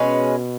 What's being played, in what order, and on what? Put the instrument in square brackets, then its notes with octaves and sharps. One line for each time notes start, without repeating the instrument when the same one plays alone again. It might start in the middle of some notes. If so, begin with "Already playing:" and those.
Already playing: [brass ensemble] B2 [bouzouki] G#3 C#4 B4